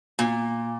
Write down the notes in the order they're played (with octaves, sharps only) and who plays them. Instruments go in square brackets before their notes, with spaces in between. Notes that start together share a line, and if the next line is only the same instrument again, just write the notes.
[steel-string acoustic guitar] A#2